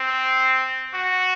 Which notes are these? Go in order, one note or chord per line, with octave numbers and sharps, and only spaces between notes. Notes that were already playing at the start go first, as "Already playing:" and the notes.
Already playing: C4
F#4